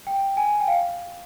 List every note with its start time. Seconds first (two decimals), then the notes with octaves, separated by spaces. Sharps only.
0.07 G5
0.37 G#5
0.60 G5
0.68 F5